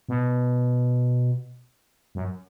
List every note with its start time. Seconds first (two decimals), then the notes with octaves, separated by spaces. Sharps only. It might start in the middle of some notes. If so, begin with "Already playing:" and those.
0.09 B2
2.15 F#2